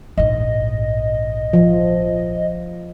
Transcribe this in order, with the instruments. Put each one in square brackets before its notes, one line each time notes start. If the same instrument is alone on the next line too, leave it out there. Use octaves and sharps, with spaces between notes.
[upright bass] A#1 G#2 [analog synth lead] D#5
[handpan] F3